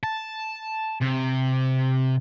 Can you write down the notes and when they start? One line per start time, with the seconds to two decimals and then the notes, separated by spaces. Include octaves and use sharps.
0.03 A5
1.01 C3